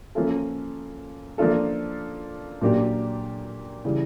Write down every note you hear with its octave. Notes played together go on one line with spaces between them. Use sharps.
F3 A#3 C#4 F4 A4
F3 A#3 D4 F4 A4
A#2 F#3 A#3 D4 G4
C#3 E3 G3